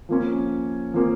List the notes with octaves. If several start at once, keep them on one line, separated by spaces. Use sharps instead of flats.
F3 A#3 C#4
F3 A#3 C#4